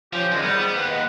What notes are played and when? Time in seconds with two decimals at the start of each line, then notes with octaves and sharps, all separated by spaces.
0.13 F3 C#4 F4 G4
0.32 F#2 A#2 D#3 G#3
0.43 G#2 G3 B3
0.74 D#2 B4
0.90 D#5 F#5